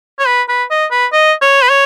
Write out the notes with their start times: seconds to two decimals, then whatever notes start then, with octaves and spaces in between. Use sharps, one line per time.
0.20 C#5
0.27 B4
0.49 B4
0.71 D#5
0.91 B4
1.12 D#5
1.41 C#5
1.62 B4
1.69 C#5